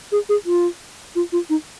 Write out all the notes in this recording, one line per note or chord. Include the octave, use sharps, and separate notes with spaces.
G#4
G#4
F4
F4
F4
D#4